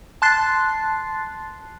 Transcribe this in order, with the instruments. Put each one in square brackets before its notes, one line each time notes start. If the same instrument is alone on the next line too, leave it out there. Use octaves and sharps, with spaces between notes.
[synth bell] A5 C6 F#6 A6 C7